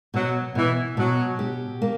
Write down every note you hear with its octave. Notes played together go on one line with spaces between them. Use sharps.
B2 F#3
B2 E3
B2 F#3
G4
A#3